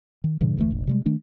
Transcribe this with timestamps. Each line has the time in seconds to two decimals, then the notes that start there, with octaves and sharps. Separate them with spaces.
0.24 D#3
0.41 G2 A#2 C#3 E3
0.57 F1 D2 E3 A3
0.71 F1 A#1
0.87 C3 G3 G#3
1.06 D#3 A3 D4